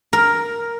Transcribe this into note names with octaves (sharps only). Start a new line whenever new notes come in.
A#4